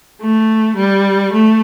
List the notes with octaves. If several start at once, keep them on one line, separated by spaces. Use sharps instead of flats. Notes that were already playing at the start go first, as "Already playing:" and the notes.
A3
G3
A3